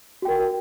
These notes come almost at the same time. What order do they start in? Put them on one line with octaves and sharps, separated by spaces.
F#4 G5 A#4